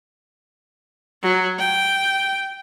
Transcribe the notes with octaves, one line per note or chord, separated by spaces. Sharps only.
F#3
G5